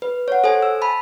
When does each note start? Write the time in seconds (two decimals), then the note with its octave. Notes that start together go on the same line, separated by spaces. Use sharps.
0.02 B4
0.28 C#5 F#5
0.44 A4 C5 G#5
0.62 E6
0.82 A5 B5